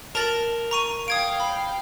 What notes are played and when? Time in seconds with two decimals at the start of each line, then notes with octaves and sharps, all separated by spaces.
0.15 A#4 A5 A6 F#7
0.71 A#5 C#6 D#7
1.08 F5 G5 D#6 G#6 D7
1.40 B5